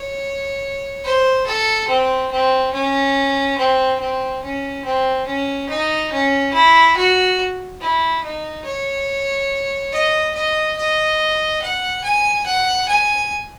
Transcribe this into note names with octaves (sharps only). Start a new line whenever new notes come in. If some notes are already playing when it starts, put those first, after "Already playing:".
Already playing: C#5
C5
A4
C4
C4
C#4
C4
C4
C#4
C4
C#4
D#4
C#4
E4
F#4
E4
D#4
C#5
D#5
D#5
D#5
F#5
G#5
F#5
G#5